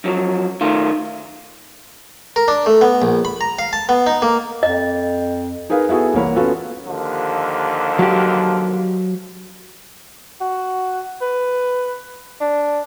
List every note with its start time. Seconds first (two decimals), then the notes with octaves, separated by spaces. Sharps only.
0.04 F#2 F3 F#3
0.61 D#3 A3 F4
2.36 A#4
2.48 D4
2.66 A3
2.81 B3
3.02 A#1
3.25 B5
3.41 A#5
3.59 F5
3.73 A5
3.89 B3
4.07 D#4
4.22 A#3
4.63 F2 D#5
5.70 D#4 G#4 A#4 B4 F5
5.89 B3 E4 F#4 G#4 A4
6.14 C2 E3 A#3 C#5 F#5 B5
6.36 B3 C#4 F4 F#4 A4 B4
6.86 D#2 D3 F3
7.99 F#3 G4
10.40 F#4
11.21 B4
12.41 D4